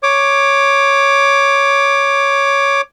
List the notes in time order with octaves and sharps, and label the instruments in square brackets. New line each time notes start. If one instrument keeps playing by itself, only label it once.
[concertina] C#5 D6